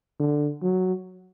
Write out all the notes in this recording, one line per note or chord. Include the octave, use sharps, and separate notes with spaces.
D3
F#3